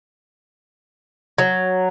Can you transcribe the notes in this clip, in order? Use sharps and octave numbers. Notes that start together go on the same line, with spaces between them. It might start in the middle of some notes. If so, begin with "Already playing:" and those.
F#3